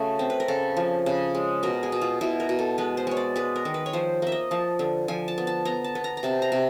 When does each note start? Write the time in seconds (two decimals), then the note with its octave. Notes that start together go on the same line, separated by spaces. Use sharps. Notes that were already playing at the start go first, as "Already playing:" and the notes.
Already playing: C#3 A3 F#4
0.19 C4
0.30 B4
0.40 A#4
0.48 C#3 A4
0.77 F3
1.06 C#3
1.35 G#3
1.63 B2 A#4
1.83 G#4
1.92 B2
2.02 F4
2.21 B2 E4
2.40 A#4
2.49 B2
2.59 A4
2.78 G#3 B4
2.97 C5
3.07 G#3 C#5
3.17 D5
3.36 G#3 B4
3.56 A#4
3.65 D#3
3.74 B4
3.86 C#5
3.93 F3 C5
4.22 A#3 E5
4.32 D#5
4.51 F3 A5
4.79 D3
5.08 F3 G#5
5.28 A5
5.38 B3
5.47 A5
5.65 B3 A#5
5.84 A5
5.95 B3
6.04 A#5
6.17 A#5
6.23 C3 A5
6.42 A#5
6.52 C3